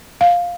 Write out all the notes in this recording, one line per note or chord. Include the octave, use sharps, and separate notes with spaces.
F5